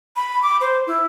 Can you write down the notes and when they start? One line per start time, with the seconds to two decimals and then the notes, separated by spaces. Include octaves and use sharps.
0.16 B5
0.42 D6
0.61 C5
0.87 E4